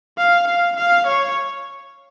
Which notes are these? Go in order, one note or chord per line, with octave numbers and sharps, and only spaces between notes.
F5
F5
F5
C#5